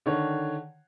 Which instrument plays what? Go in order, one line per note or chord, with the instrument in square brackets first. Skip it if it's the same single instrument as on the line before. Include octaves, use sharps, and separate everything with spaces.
[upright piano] D3 D#3 C#5